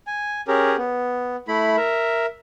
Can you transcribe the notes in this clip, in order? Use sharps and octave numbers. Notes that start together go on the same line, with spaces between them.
G#5
C#4 G4 G#4 A#4
B3
A3 E4 B5
A#4 E5